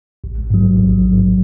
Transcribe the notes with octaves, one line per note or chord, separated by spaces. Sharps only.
A1
G#2 F#3
A1
G#2 F#3